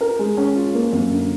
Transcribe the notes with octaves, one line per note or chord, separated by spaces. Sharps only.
A#4
G#3
C#4
F4
A#3
F#2
D3